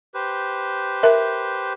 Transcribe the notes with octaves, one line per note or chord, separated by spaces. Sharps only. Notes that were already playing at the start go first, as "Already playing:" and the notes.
G4 B4 C5
A#4 E5